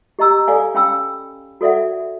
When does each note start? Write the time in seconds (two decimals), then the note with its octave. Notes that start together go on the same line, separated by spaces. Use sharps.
0.19 G4 D#5 A#5 E6
0.47 A4 D5 F5 G#5
0.74 C#4 F5 G5 B5 E6
1.61 F#4 A4 D5 E5 F#5